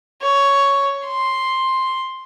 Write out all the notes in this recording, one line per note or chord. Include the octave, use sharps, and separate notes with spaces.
C#5
C6